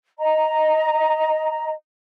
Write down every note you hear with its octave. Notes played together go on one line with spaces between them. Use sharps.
D#5 A#5